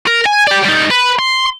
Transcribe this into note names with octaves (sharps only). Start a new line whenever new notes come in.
A#4
G#5
G4 D5
G3 D#4
B4
C6